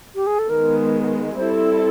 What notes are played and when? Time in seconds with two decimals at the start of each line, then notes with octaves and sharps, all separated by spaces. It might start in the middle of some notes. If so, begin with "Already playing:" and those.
0.15 G4
0.27 G#4
0.39 A4
0.50 D#3 G#3 B3 A#4
1.37 G3 C4 E4 A4 C5